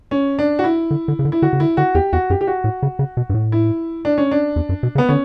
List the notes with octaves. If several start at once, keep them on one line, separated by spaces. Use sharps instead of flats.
C#4
D4
F#4
E4
D3
D3
C#3
D3
E4
D3 F#4
C#3
D3 E4
D3 F#4
E2 G4
E2 F#4
F#2 G4
G4
F#4
A2
C#3
C#3
B2
G2
A2
E4
D4
C#4
D4
E2
F#2
B2
C#3
B3
D3 C#4